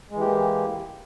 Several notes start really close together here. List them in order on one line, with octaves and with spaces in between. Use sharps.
G#3 E3 G4 A#3